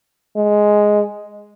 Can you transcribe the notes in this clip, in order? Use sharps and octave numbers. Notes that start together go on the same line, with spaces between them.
G#3